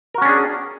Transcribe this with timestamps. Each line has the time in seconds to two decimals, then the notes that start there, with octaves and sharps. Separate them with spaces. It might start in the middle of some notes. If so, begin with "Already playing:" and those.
0.14 A#4
0.18 F#4
0.22 C#4
0.25 D4
0.29 G#4